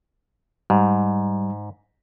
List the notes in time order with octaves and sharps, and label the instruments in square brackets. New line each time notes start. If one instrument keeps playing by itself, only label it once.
[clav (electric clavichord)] G#2 [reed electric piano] G3